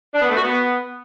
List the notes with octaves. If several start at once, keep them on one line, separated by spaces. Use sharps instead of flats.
D4
B3
A3
F#4
B3